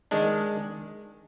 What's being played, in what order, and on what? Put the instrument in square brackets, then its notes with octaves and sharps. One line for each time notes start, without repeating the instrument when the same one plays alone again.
[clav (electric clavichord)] D#3 G#3 D4